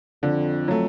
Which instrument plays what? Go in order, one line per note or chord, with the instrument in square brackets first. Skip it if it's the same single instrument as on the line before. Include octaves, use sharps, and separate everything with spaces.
[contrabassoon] F2 [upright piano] D3
[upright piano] F#3 A3